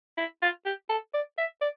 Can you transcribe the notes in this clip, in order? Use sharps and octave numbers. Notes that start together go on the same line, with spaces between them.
E4
F4
G4
A4
D5
E5
D5